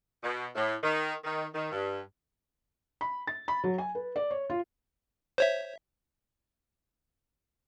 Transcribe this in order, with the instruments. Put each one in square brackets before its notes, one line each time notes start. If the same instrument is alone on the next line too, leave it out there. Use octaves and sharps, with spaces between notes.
[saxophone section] B2
A2
D#3
D#3
D#3
G2
[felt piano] B5
A6
B5
F#3
G#5
B4
D5
C#5
F4
[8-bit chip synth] C5 C#5 E5